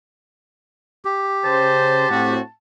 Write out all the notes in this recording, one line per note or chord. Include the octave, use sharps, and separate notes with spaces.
G4
C#3 C5 A5
A2 C4 F#4